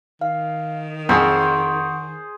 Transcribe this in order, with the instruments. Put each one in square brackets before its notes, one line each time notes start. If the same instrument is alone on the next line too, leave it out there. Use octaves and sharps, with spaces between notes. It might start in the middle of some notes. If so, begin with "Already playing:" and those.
[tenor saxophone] D#3 [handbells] F5
[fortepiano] F2 [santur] G#4 C5 [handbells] F#5 C#6 D7